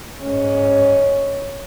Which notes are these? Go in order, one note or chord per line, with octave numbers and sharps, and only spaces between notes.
G#2 C#4